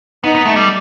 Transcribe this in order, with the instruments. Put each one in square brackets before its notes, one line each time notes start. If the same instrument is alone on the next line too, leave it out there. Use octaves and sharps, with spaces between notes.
[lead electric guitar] B3 [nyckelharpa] D#4
[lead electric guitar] B3
A3
G3